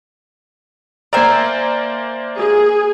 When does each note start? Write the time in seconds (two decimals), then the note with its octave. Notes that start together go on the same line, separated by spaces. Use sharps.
1.13 A#3 A#4 C5 D5 E5 G#5
2.36 G#4